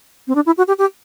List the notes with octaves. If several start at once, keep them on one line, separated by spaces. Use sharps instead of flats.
C4
D4
E4
F#4
G4
G4